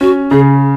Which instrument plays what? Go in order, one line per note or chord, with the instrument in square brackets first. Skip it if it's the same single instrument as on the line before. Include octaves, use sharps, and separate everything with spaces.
[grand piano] C#4 [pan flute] F#4
[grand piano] C#3 [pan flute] G#4